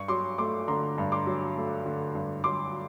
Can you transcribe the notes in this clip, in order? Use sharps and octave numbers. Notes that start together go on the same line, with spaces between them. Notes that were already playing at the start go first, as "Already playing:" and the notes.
Already playing: G2 C#6
F#3 C6 D6
A3 C6 D6
D3 A#5 C6
G2
C6 D6
F#3
A3
D3
G2
F#3 C6 D6